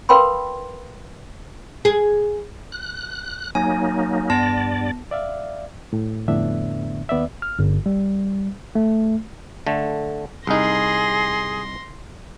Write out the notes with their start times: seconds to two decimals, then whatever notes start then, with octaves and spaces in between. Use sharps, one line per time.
0.09 A#4 B4 F5 G5 B5 C6
1.85 G#4
2.72 F#6
3.55 F#3 A#3 D#4 G#5
4.30 G2 B3 D5 A5 A#6
5.11 D5 E5 F5
5.93 A2
6.28 F2 A2 D3 B3 D4 E5
7.09 D#2 B3 D5 E5
7.42 F6
7.59 G1
7.86 G3
8.75 A3
9.67 D3 A3
10.47 C2 D#4 G#4 C6 A#6